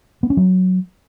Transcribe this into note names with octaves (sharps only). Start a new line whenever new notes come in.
B3
C#4
F#3